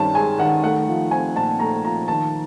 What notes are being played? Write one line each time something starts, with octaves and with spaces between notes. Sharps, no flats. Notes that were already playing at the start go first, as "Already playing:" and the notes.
Already playing: G2 D#3 C#4 A5
G#3 G#5
D#3 F#5
A3 F#5
F3
C4 G#5
A#2 A5
A3 A#5
F3 A#5
D#3 A5